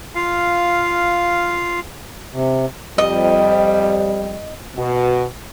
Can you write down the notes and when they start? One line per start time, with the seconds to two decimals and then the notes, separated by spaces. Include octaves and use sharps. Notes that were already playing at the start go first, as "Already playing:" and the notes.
0.15 F4 F5
2.32 C3
2.98 F2 G3 D#5
4.76 B2